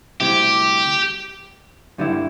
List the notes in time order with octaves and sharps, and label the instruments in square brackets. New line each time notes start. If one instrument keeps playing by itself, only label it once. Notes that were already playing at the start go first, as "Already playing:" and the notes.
[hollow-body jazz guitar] D2 C3 G3 E4 C5 [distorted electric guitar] G4
[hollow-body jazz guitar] G2 D3 G3 E4